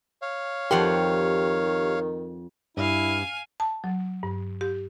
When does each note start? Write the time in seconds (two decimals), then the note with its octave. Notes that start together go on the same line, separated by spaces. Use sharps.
0.22 C#5 F5
0.71 F2 D#3 G4 F#5 C6
2.77 G2 E4 F5 G#5
3.60 A5
3.84 F#3
4.23 G2
4.61 G4